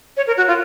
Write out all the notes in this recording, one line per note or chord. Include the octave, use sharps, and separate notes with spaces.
C#5
A#4
F#4
F4